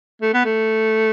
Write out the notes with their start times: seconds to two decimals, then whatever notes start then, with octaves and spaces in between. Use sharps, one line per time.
0.22 A3
0.34 B3
0.45 A3